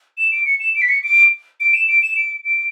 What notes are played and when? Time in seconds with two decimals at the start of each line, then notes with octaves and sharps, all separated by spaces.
0.18 E7
0.32 D7
0.45 C#7
0.60 E7
0.75 D7
0.82 B6
0.89 C#7
1.04 D7
1.60 D7
1.74 E7
1.88 D7
2.02 E7
2.16 D7
2.45 D7